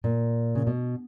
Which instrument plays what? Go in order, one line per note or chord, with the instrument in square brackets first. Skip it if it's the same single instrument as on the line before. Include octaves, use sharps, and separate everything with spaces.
[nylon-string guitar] A#2
C#3
B2